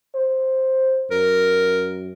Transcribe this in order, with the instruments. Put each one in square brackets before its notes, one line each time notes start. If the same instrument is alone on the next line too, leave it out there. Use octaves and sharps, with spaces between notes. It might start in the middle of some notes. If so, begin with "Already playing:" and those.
[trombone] C5
[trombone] F#2 [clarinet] A#4